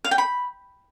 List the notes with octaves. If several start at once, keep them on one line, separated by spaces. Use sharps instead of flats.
F5
G5
B5